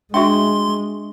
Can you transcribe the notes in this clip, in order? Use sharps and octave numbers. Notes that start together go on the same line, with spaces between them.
G#3 D4 F#4 E5 G5 C6 C#6